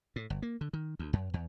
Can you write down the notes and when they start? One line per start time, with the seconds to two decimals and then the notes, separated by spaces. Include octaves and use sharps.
0.16 A2
0.30 G1
0.42 A#3
0.61 D3
0.73 D#3
0.99 D2
1.13 F#2
1.34 E2